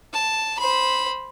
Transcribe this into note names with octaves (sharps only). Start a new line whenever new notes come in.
A5
C5 B5